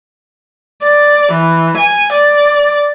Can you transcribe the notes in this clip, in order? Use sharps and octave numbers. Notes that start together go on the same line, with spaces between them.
D5
E3
G#5
D5